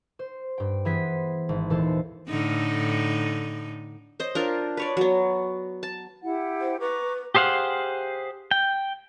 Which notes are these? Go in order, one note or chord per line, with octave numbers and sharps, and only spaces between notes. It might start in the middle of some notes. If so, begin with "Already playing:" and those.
C5
G2 G5
E3 B3 G#4 C5 B6
G#1
D#2 A#2 E3 A4 C5
A2 D3 D#4
C5 D#5
D4 F4 A#4
B4 C#5 D5
F#3 B3
A5
E4 G4 F#5
C5
B4 A#5 C#6 D6
G4 G#4 C5 F5 F#5
G5